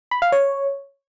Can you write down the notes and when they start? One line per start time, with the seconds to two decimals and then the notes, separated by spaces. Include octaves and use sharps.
0.11 B5
0.22 F5
0.32 C#5